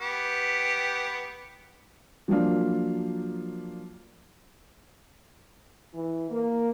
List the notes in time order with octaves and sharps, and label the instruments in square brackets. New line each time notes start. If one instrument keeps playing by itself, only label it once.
[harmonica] B3 G4
[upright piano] F3 F#3 A#3 D4 F4
[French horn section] E3
A#3